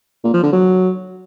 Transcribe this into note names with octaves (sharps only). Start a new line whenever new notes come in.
A#2
F3
D3
F#3